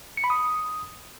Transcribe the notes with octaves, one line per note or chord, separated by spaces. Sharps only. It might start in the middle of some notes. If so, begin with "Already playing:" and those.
C#7
B5
D#6